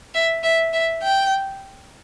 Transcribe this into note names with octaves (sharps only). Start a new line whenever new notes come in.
E5
E5
E5
G5